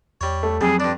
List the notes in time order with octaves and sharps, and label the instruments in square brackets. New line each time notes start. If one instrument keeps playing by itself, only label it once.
[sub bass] E2 [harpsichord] G3 C#5
[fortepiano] A3
[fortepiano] F2 [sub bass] F#3 [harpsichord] G3 [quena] G#4
[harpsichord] G2 D4 [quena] D5